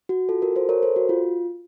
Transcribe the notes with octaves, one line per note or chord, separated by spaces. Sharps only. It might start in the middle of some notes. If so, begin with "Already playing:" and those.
F#4
F4 A4
F#4 A#4
A4 C5
A#4 C#5
A4 C5
F#4
F4